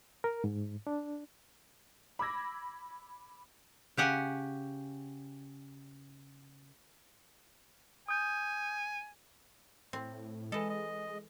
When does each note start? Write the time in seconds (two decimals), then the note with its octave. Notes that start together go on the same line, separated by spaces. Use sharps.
0.24 A#4
0.44 G#2
0.87 D4
2.19 B5 D6 E6 G#6 A#6
3.97 C#3 G4 F#5 G#5
8.08 G#5 D#6 G6
9.93 A2 C4
10.52 E3 G#3 A4 D#5
10.70 D#5